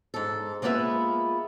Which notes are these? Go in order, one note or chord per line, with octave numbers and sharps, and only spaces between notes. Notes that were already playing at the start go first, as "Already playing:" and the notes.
G#2 A4
G#3 A#3 B3 F4 B4 E5